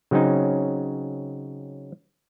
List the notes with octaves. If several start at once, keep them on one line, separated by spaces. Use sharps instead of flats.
C#3 F#3 C4 C#4 D#4